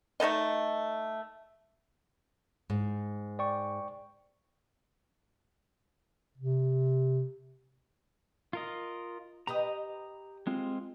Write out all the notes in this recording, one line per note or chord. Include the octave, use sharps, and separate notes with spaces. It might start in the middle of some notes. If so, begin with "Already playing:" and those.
A3 D#4 A4 D#5
G#2
D5 G5 C#6
C3
F4 A#4 D#5
G4 B4 D#5 A#5 D#6
G#3 C4 F4